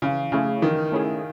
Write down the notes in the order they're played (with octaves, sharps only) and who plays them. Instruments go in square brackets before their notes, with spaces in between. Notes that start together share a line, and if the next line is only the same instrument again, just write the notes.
[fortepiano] C#3 [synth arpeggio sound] E3
[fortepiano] C#3 [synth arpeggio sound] A3 C#4 E4 G#4
[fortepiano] D#3 [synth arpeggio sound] E3
[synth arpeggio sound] A3 C#4 E4 G#4